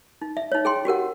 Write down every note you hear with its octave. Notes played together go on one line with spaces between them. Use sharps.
D#4
E5
D#4 C#5
G#4 G5 C6
F#4 G4 A#4 F#5